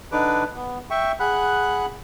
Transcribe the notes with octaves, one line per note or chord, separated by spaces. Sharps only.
D3 D4 D#4 B4 D6
B3
E5 G5 C#6
G#4 F#5 B5 F#6